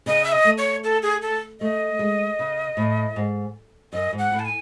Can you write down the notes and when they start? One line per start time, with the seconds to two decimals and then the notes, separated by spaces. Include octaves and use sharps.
0.06 C#3 D#5
0.24 E5
0.32 D#5
0.45 A3
0.58 C#5
0.84 A4
1.03 G#4
1.22 A4
1.61 A3 D#5
1.99 G#3
2.39 C#3
2.77 A2
3.16 G#2
3.93 F#2 D#5
4.13 G#2
4.18 F#5
4.32 A2
4.39 A5
4.45 G#5